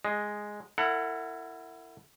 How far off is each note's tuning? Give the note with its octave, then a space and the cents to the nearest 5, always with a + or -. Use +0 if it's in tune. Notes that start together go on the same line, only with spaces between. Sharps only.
G#3 +0 D#5 +0
E4 +10 A#4 -45 F#5 +0